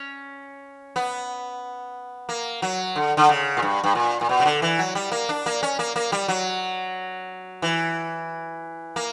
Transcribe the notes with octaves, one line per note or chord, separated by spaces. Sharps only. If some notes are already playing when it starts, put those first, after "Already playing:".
Already playing: C#4
B3
A#3
F#3
D3
D3
C#3
A#2
G2
G2
A#2
A#2
B2
C#3
D3
E3
F#3
G3
A#3
D4
A#3
C#4
A#3
A#3
G3
F#3
E3
A#3